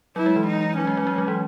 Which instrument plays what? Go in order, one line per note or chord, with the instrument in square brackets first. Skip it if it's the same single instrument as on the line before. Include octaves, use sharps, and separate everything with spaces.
[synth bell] F#3 [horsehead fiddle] E4
[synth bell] G#3
E3
[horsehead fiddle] D#4
[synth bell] F#3 [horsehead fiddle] C#4
[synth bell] G#3
F#3
G#3
F#3
E3